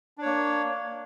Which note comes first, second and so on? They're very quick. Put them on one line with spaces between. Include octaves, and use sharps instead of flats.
D4 C#5 A#3